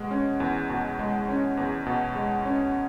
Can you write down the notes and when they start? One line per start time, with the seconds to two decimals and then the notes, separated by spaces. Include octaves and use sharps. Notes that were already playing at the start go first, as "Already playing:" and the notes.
Already playing: B2 G#3
0.11 C#4
0.40 E2
0.70 B2
0.99 G#3
1.29 C#4
1.57 E2
1.86 B2
2.15 G#3
2.46 C#4